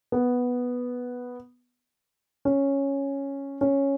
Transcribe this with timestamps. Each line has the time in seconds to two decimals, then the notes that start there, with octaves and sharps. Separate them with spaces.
0.12 B3
2.45 C#4
3.61 C#4